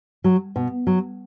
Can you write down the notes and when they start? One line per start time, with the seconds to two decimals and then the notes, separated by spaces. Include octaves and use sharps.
0.24 F#3
0.56 B2
0.87 F#3